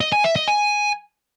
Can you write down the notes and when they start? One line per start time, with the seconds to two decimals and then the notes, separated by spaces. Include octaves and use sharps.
0.01 D#5
0.13 G#5
0.24 E5
0.36 D#5
0.48 G#5